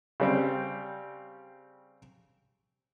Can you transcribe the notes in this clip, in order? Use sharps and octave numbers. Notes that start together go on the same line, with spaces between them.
C#3 G3 C4